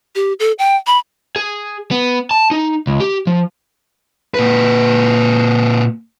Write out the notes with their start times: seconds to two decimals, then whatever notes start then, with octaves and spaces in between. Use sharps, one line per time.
0.15 G4
0.40 A4
0.59 G5
0.87 B5
1.36 G#4
1.91 B3
2.31 A5
2.51 D#4
2.87 C#2
3.00 G4
3.27 F3
4.34 A#2 B4